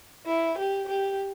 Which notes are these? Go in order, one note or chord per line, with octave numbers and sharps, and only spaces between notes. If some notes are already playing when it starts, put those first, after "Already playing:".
E4
G4
G4